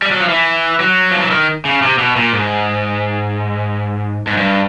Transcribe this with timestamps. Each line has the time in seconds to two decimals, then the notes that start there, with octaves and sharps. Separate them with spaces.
0.02 G3
0.11 F#3
0.20 F3
0.29 E3
0.80 F#3
1.11 F3
1.21 E3
1.31 D#3
1.65 C#3
1.82 C3
1.98 B2
2.16 A#2
2.33 G#2
4.27 G#2
4.37 G2